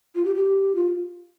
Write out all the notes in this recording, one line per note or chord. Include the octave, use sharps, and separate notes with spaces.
F4
G4
G4
F4